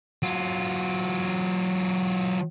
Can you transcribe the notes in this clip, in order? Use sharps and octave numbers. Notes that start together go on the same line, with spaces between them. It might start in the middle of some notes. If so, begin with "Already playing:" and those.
F#3 F4